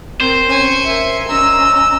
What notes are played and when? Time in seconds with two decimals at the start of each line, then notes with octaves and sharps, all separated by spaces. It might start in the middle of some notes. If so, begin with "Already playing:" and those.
0.20 C4 A#4 C5
0.49 C#4 G#5 C#7
0.85 A#4 E5
1.29 C#4 D#5 A#5 E6